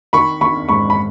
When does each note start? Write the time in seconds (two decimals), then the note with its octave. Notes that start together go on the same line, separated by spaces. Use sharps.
0.13 D#3 B5 C#6
0.41 D#3 B5 C#6
0.69 G#2 B5 C#6
0.90 B5